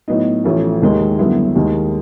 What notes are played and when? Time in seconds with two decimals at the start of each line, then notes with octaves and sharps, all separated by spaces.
0.08 A2 F#3 B3 D#4
0.44 A1 A2 F3 A3 C#4
0.82 D#2 D#3 G#3
1.19 F#2 D3 G3 B3 E4
1.55 D#2 D#3 G#3